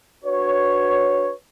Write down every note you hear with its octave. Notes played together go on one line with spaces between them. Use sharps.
D4 F#4 B4 C#5